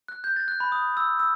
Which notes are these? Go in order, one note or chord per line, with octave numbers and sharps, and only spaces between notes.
F#6
G6
A6
F#6
B5
D#6
E6
E6